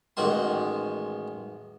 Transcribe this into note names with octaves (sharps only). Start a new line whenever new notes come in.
A1 D#3 G#3 F#4 C6